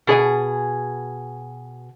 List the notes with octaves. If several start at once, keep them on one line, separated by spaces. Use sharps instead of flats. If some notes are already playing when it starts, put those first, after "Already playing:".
B2 G#4 C#5 G#5